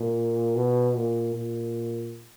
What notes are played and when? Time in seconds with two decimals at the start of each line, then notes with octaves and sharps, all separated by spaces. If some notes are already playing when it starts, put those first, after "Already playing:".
Already playing: A#2
0.56 B2
0.96 A#2
1.35 A#2